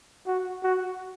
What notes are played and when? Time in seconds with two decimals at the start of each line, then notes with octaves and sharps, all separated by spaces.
0.27 F#4
0.63 F#4